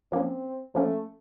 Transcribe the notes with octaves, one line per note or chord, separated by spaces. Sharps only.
F3 A#3 C4 C#4
F3 A3 A#3 C#4